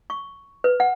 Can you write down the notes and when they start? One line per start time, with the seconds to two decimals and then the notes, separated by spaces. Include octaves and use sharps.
0.10 C#6
0.64 B4
0.80 F#5